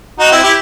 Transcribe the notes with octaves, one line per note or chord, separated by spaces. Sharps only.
D#4 F#4
C4 E4
E4 G4